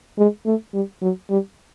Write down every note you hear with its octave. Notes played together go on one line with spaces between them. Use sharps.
G#3
A3
G3
F#3
G3